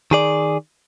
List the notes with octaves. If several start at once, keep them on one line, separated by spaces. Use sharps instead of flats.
D#3 G#4 D5